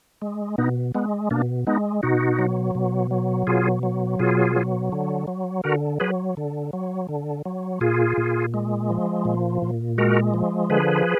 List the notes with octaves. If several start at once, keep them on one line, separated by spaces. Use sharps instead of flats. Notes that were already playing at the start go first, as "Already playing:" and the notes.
G#3
B2 B3 D#4
G#3 B3
B2 A#3 D4
G#3 B3 D#4
B2 D#4 F#4
F#3
B2
F#3
B2 F4 G#4
F#3
B2 F4 G#4
F#3
D3
F#3
D3 F#4 A#4
F#3 G#4 B4
D3
F#3
D3
F#3
A#2 F4 G#4
A#2
G#3
F3
A#2
A#2
G#3 F#4 A#4
F3
D3 G#4 B4